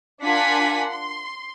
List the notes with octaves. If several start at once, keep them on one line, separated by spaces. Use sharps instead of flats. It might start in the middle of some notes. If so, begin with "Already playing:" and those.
D4 F4 A#4 F#5 G#5 B6
C6